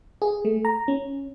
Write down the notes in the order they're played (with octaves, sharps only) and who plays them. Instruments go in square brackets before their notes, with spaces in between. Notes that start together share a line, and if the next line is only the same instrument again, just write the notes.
[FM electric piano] G#4
A3
A#5
C#4